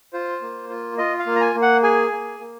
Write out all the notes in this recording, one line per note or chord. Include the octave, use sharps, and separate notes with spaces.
F4 C5
A#3
F4
F4 D#5
F5
A#3
A#5
G#5
A#3
F#5
G#4 G#5
A#3
A#3